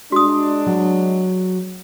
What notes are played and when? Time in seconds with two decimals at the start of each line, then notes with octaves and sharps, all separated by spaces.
0.12 G#3 D4 F#4 D#6
0.66 F#3